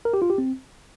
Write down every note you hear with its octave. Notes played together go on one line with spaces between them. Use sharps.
A#4
G4
F4
G4
C4